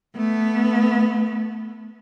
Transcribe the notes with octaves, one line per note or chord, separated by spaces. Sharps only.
A3 B3